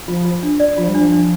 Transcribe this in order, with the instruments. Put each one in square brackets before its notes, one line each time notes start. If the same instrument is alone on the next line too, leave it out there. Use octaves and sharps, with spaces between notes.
[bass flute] F3 [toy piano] F4
[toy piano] F4
D4
D5
[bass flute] F3 [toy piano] F4
[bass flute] G3
[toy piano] D4
[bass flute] F3
[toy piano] D4